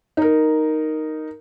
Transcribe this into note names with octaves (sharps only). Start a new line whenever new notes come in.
D#4 A#4